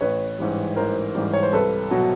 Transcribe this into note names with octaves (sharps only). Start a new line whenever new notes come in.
A1 B4 C#5
G#2 E3 G3
A1 A#4 C5
G#2 E3 G3
C#5
C5
C2 A4 B4
B2 F#3